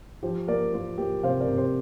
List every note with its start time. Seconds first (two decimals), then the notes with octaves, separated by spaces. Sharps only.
0.23 F3 G4 C5
0.48 A#3 A#4 D5
0.73 A#3 F4 A#4
0.98 A#3 G4
1.23 C3 C5 F5
1.40 A#4 D5
1.48 C3
1.57 G4 C5